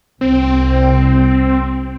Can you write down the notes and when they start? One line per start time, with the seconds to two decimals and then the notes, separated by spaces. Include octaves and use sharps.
0.21 C2 C4